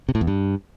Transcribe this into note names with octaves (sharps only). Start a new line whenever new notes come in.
C3
A2
E2
G2